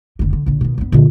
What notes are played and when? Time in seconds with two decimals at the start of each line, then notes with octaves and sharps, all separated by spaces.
0.19 F1 D3
0.33 D3
0.46 A#1 D3
0.61 B2 D#3
0.78 G2 B3
0.92 A#2 D3